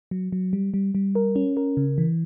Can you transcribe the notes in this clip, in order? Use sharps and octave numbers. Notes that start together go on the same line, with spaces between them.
F#3
F#3
G3
G3
G3
A#4
C#4
A#4
C#3
E3